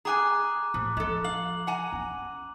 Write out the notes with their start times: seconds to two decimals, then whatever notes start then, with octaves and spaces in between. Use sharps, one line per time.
0.05 G#4 G5 G#5 A#5 D6 F#6
0.74 A2 F3
0.97 F3 G#3 A4
1.25 F5 F#7
1.67 F#5 G#5 A#5
1.92 C#4